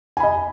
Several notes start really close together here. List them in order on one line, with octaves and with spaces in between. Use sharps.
G#5 B5 D#5